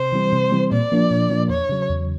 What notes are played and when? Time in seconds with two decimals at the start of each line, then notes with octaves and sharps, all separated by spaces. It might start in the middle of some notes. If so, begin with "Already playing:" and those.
Already playing: C3 C5
0.12 E3 G3 C4
0.33 C3
0.52 E3 G3 C4
0.72 A#2 D5
0.92 F3 A#3 D4
1.11 A#2
1.30 F3 A#3 D4
1.49 E2 C#5
1.69 C#3 F#3
1.89 E2